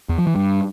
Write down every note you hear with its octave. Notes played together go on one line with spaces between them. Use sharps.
E2
F3
E3
G2